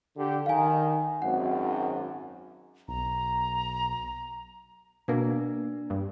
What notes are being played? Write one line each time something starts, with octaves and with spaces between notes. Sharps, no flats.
D3 G4
D#3 F5 G#5
G#1 F#2 F#5
B1 A#5
B2 A#3 D4
G2